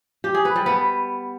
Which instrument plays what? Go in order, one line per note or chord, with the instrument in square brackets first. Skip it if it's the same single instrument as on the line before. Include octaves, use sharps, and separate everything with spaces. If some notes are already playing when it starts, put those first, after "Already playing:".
[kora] G4
G#4
B4
G3
B3